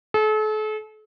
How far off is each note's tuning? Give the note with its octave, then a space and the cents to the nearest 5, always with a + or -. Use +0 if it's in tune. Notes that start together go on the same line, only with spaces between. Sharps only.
A4 -40